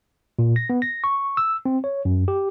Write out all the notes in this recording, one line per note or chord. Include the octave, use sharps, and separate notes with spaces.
A#2
A#6
B3
A#6
C#6
E6
C4
C#5
F#2
G4